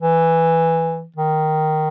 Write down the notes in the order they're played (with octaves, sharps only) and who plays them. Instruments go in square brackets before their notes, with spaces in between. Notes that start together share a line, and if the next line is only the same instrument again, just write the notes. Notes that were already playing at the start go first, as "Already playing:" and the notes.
[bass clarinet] E3
D#3